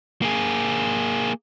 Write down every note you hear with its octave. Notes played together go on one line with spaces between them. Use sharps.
A#3 G#4